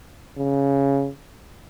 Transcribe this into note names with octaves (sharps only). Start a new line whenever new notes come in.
C#3